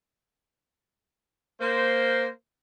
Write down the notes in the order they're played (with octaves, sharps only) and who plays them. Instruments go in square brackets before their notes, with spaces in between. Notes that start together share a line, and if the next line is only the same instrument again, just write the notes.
[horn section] A#3 C5